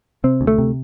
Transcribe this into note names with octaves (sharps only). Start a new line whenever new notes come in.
C3 C4
D2
A3
C3